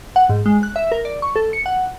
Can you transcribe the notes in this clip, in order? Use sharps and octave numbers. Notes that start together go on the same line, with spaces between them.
F#5
G#2
G#3
F#6
E5
A#4
D5
C#6
A4
C#7
F#5